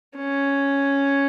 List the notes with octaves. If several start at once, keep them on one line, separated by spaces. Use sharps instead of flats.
C#4